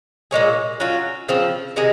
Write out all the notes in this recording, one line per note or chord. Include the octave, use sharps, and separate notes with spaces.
A#2 G#3 C#4 G#4
F#3 C#4 F4
C#3 F3 C4
C3 D#3 G#3